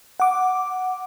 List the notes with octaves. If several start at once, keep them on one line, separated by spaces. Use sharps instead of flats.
F#5 D6